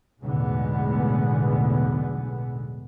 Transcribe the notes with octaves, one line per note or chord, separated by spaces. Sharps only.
B1 E2 A2 D3 G#3 B3